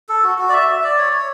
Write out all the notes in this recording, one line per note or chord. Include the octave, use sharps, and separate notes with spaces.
A4
F#4
F#4
D5
E5
E5
D5
C#5
C#5